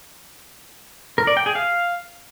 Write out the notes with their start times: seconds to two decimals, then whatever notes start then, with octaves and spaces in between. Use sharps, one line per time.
1.18 A#4
1.27 D5
1.37 G5
1.46 G#4
1.55 F5